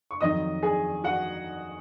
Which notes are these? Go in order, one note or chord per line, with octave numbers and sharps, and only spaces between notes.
C#6
F2 D#3 F#3 D#5 D#6
G#4 G#5
F#4 F#5